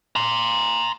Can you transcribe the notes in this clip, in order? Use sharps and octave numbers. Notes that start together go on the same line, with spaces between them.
A#5 C6